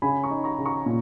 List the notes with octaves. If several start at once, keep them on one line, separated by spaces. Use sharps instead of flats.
C#3 G#5 B5
A#5 C#6
D#4
A#5 C#6
C#3
A#5 C#6
A#2